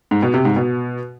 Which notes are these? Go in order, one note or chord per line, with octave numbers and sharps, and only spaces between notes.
G#2
B2
C3
G#2
B2